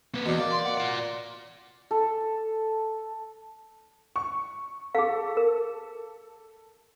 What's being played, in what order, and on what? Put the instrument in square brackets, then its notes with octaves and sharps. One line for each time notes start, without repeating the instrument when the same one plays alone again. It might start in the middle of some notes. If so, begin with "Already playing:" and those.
[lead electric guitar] A#3 B4
[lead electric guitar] E2 [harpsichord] B2 D4
[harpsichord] A#3 [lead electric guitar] D5
[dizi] C6
F#5
[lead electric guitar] F4 D5
[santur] A4
[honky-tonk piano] C#6
[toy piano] G#4 F5 [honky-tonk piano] A4
[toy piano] A#4